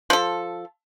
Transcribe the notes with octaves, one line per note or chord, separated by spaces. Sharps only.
F3 A4